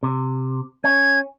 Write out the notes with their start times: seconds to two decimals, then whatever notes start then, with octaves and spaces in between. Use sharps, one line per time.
0.03 C3
0.84 C#4 G#6